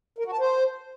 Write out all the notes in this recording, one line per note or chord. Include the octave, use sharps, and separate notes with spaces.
A#4
F#4
A5
C5